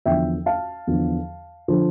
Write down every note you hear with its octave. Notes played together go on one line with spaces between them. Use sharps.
E2 D3 F3 E5 G5
F5 A5
E2 D3 F3
D3 F3